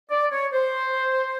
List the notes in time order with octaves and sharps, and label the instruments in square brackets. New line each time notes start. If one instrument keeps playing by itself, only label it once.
[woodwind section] D5
C#5
C5